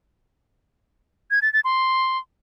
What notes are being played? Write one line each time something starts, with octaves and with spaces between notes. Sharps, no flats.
G#6
A6
A6
C6